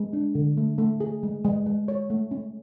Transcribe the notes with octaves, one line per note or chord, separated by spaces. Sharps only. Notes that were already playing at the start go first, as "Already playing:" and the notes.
Already playing: G#3
D4
D3
A3
A3
G#4
G#3
G#3
G#3
C#5
A3
C#4